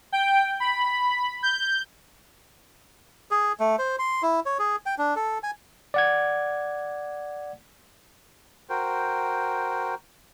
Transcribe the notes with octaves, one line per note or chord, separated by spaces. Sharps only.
G5
B5
G6
G#4
A3
C5
C6
E4
C#5
G#4
G5
D4
A4
G#5
D5 F#5 G#6
F#4 A#4 C5 G5